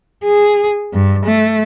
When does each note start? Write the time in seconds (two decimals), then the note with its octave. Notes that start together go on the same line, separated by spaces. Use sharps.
0.24 G#4
0.94 G2
1.26 A3